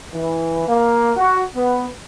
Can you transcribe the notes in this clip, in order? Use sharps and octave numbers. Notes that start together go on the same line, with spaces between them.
E3
A#3
F#4
B3